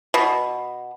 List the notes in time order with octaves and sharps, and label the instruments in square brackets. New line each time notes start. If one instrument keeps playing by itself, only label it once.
[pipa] B2